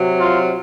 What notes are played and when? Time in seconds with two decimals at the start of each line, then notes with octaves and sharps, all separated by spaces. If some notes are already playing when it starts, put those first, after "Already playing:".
Already playing: C3 F#3
0.18 F4